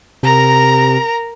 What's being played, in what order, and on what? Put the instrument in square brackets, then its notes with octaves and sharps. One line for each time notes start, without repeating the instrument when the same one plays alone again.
[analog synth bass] C3 [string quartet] A#4 A#5